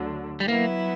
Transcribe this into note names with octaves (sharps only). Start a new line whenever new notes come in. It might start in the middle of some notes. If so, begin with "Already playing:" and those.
Already playing: D2 D3 F#3
G3
F#3 A#3 B3 E4